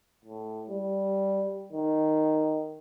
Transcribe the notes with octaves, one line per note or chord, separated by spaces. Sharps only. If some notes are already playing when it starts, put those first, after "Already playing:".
A2
G3
D#3